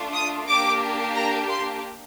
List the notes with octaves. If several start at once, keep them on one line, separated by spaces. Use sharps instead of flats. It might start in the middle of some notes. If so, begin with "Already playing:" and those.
Already playing: A3 D4 F4
D#6
A#3 D4 G4 D6
A#5
C6